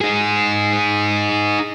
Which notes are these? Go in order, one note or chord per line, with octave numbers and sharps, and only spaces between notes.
D#4 G#4